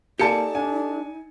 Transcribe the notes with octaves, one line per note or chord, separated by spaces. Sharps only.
A#3 D#4 G4 A4 D5 G#5 A5 C#7
D4 G#5